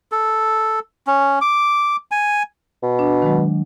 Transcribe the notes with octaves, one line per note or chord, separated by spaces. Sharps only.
A4
C#4
D6
G#5
B2
D4
D#3 F#3 G#3